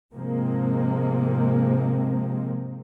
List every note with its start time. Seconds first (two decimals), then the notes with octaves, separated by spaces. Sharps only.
0.12 G#2 C3 F3 G#3 A#3 C4